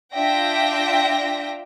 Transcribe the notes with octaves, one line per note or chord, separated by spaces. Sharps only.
D4 F4 E5 G5 A#6